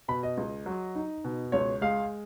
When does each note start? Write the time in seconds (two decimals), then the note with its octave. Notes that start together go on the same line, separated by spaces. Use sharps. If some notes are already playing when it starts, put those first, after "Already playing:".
0.08 B2 B5
0.23 D#5
0.38 C#2
0.66 F#3
0.95 D#4
1.25 B2
1.52 C#2 C#5
1.81 G#3 F5